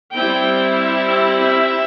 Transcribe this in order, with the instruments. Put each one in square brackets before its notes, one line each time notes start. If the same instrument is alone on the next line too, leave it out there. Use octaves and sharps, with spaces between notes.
[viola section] G3 C4 E4 G5
E5
E5